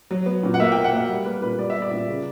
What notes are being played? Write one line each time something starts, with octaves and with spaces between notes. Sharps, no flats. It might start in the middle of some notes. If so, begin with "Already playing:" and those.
F#3
B3
A#2
F#5
A#3 E5
B2 G5
F#5
A#3 E5
G3
A#3 B4
A#2 B4
G3 D5
B3 E5
D5
A#2
C#3